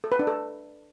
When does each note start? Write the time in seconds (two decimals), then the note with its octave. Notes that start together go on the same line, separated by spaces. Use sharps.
0.04 A4
0.12 B4
0.19 D4
0.27 A4